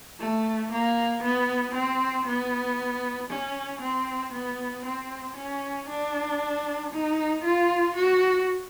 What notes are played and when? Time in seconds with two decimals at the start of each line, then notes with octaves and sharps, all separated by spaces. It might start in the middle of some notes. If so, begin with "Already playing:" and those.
0.19 A3
0.71 A#3
1.23 B3
1.74 C4
2.26 B3
3.30 C#4
3.81 C4
4.33 B3
4.85 C4
5.37 C#4
5.89 D4
6.92 D#4
7.44 F4
7.96 F#4